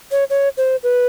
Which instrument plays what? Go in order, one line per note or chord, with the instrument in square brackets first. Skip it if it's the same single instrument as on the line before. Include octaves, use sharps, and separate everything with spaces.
[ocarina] C#5
C#5
C5
B4